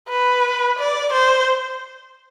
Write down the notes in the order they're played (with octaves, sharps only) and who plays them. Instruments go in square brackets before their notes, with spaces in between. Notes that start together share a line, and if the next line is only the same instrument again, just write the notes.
[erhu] B4
D5
C5